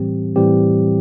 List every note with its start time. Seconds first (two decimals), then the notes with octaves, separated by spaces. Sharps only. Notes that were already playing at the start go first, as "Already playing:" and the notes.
Already playing: A2 E3 G3 C4 G4
0.36 A2 E3 G3 C4 G4